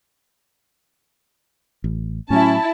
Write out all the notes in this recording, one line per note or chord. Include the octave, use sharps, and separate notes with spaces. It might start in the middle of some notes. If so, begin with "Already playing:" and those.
A1
A2 F#3 C#4 E4 A5